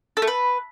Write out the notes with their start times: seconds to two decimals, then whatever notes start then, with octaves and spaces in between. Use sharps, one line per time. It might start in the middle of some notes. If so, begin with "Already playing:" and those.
0.17 A4
0.22 A3
0.27 B4